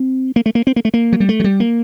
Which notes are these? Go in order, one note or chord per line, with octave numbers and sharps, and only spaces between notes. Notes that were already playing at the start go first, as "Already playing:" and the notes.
Already playing: C4
A#3
A3
A#3
C4
A#3
A3
A#3
F#3
G3
A3
F#3
G3
A#3